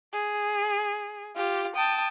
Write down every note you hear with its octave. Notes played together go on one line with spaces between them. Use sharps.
G#4
F4 G4
G5 A5 D#6